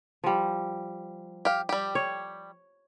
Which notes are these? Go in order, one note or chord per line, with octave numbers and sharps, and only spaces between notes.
F3 G3
G4 F5
G3 G4
C#5